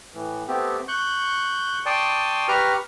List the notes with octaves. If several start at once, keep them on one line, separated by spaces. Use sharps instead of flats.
A2 E3
A3 B3 C4 G4
C#6 F#6 G6
D5 G5 A5 C6 C#6 D#6
G4 B4 A#5 C#6 F6